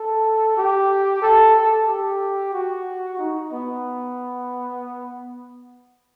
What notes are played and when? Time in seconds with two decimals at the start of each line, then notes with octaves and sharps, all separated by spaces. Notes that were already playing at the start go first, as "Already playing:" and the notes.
Already playing: A4
0.57 G4
1.22 A4
1.56 A4
1.88 G4
2.53 F#4
3.19 D#4
3.52 B3